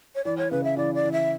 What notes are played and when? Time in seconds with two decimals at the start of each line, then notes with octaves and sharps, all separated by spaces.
0.15 C#5
0.25 E3 D5
0.38 C#5
0.51 C#3 B4
0.64 E5
0.77 E3 D5
0.95 D5
1.04 E3
1.12 E5